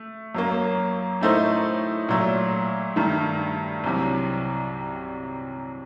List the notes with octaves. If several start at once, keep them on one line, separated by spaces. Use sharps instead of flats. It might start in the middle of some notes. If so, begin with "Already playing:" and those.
Already playing: A3
F#2 F#3 A#3
A2 A3 D#4 A4 C5
A#2 F#3 A3
G2 D#3 A3
C2 C3 F#3